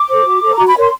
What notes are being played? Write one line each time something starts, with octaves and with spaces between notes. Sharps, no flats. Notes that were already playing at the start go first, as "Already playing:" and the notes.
Already playing: D6
A4 C5
F#4
A4 C5
A#5
F#4
B5
A#4 C#5 C6